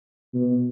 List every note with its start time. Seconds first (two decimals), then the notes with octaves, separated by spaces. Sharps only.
0.34 B2